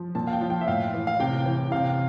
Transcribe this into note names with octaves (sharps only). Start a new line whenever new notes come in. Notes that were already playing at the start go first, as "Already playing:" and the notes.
Already playing: F3
A#2 A5
F5
G5
F3
G5
E5
A2 F5
E3
F5
C3 G5
E3
C3 F5